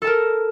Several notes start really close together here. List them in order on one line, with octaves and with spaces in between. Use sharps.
A4 A5 A#4